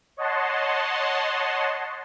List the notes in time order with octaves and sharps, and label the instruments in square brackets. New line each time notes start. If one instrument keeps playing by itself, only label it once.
[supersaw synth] C#5 D#5 F#5 A5 C6